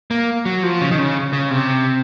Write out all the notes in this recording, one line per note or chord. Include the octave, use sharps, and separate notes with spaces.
A#3
F#3
F3
C#3
D#3
C#3
C#3
C3